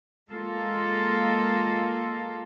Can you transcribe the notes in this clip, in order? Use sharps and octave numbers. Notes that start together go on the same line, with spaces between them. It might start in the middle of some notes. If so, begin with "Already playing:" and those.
G#3 A#3 F4 A4